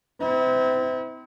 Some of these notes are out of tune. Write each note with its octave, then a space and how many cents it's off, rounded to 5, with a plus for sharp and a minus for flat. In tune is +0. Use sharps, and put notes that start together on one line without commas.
C4 -35 E4 -35